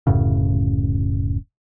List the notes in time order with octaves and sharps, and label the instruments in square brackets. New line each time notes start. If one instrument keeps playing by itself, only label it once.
[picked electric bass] D1 F#2 A2 C#3